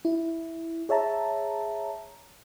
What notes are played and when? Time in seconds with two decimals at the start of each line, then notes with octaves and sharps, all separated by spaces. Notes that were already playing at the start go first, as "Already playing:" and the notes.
0.05 E4
0.89 G#4 C#5 E5 A5 A#5